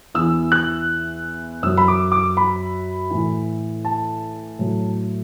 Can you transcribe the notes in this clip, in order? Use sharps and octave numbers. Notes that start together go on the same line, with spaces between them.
E2 E3 E6
F#6
F#2 F#3 E6
B5
D6
D6
B5
A2 E3
A5
A2 F#3